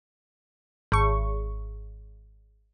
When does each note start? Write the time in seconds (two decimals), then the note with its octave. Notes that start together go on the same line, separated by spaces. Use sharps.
0.92 G#1 C#6